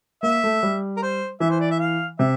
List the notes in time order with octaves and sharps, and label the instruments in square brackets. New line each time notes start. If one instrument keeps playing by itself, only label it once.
[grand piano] A#3 [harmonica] E5
[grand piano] A3
G3
[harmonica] A#4
C5
[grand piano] E3 [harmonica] E5
[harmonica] C5
D5
E5
F5
[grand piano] C3 [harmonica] E5